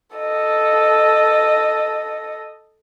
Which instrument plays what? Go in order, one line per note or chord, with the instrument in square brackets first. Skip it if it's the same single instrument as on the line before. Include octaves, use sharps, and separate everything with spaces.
[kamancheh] A4 D#5